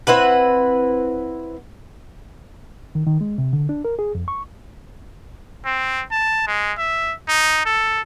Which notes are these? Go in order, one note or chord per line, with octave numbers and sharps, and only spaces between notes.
C4 E4 B4 F#5
D#3
D#3
G#3
C3
D3
D4
A#4
G#4
F2
C#6
C4
A5
G#3
E5
D#4
A4